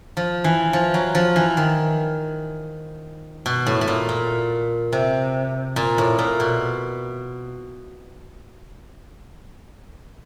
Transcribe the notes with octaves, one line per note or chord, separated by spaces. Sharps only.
F3
E3
F3
F#3
F3
E3
D#3
B2
A2
A2
A#2
A#2
C3
A#2
A2
A#2
B2